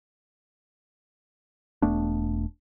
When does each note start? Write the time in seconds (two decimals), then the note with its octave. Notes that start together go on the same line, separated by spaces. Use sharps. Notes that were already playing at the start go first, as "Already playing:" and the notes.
1.82 E1 A3 B3 D4